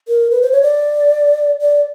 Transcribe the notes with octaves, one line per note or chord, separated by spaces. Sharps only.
A#4
B4
C5
C#5
D5
D5